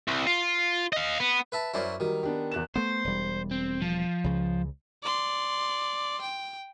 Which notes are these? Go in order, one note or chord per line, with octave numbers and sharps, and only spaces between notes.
C2
F4
D#5 F5
B3
B4 E5 A5
F#2 C#4 E4 A#4 C5 D5
D#3 F#3 G3
B3 D4 G4
E2 F#6 E7
A3 B3 C5
E1 G3
C4
F3
C#2 C#3
D5 C6
G5